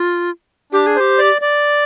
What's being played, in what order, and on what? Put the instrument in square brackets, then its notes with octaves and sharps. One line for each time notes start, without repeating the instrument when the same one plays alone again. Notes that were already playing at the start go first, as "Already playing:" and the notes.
Already playing: [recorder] F4
[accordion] D4 [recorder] G4
[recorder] G#4
[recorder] G4 [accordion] C5
[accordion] D5
D5